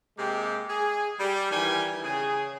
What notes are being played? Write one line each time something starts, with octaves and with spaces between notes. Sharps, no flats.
C3 G#3 A#3 G4
G#4
G3
D#3 E3 G3 G5 G#5
C#3 G#4